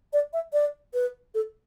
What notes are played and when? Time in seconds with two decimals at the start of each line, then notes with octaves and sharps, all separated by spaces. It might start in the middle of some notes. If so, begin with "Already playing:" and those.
0.13 D5
0.33 E5
0.53 D5
0.94 B4
1.34 A4